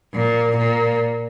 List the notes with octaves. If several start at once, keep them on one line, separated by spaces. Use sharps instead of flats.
A#2
A#2